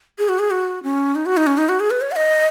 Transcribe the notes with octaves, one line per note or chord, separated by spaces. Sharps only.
G#4
F#4
G#4
F#4
C#4
D#4
F#4
D#4
C#4
D#4
F#4
G#4
B4
C#5
F#5
D#5